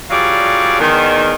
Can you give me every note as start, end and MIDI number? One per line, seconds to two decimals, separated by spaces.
0.10 0.79 54
0.10 0.79 55
0.10 0.79 65
0.10 0.79 68
0.10 0.79 74
0.80 1.34 40
0.80 1.34 51